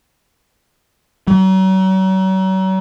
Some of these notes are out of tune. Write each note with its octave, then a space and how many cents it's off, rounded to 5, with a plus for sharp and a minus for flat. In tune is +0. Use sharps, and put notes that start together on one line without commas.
F#3 +40